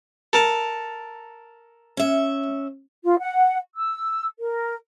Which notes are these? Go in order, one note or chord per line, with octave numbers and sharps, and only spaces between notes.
A4 A#4 A5
C#4 E5
F4
F#5
E6
A#4